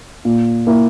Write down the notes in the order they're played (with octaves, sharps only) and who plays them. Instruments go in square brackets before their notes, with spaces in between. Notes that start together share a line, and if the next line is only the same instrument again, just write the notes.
[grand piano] A#2
A#3 E4